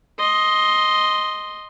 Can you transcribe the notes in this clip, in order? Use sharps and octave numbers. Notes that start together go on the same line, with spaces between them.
D#5 C6